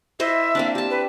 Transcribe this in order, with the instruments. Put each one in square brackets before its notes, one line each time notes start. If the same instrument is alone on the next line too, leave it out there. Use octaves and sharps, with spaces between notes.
[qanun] E4 C5 D#5 [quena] E5
[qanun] A#3 C4 D4
G4 A5
[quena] B4